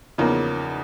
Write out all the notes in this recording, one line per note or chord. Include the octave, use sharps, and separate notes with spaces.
E2 C#3 F3 A#3 D#4